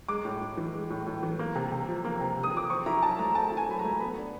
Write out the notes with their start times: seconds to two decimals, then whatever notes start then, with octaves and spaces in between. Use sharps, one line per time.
0.09 G#3 D6
0.25 A2
0.41 A2
0.57 E3
0.74 G#3
0.90 A2
1.06 A2
1.23 E3
1.39 A#3
1.55 C3
1.72 C3
1.88 F3
2.05 A#3
2.21 C3
2.37 C3
2.43 D#6
2.54 F3 D6
2.70 C4 C#6
2.86 E4 A#5
3.03 F#3 A5
3.19 A3 A#5
3.35 C4 A5
3.52 E4
3.57 G#5
3.68 F#3 B5
3.79 A#5
3.84 A3
4.00 B3 B5
4.17 D4